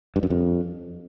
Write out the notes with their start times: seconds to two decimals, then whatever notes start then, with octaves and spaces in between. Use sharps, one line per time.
0.16 G2
0.23 F#2
0.30 F2